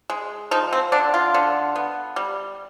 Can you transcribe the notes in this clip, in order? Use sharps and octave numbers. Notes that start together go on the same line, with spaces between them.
G#3
F3 D#4
C4
D3 D4
F4
D3
B3
G3